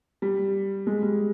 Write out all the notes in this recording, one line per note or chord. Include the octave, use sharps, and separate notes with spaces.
G3
G#3
G3